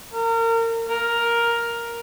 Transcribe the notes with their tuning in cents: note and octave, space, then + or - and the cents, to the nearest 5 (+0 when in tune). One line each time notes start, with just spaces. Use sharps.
A#4 -30
A#4 +5